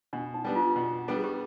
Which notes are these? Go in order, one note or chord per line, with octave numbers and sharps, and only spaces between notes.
B2 D4
D#4
G3 B3 D4
F4
B2
G3 B3 D4 A4
G#4
G4